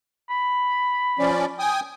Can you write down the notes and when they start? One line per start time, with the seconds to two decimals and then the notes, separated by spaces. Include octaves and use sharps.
0.30 B5
1.19 F3 C#4 D5
1.59 G5 G#5 D#6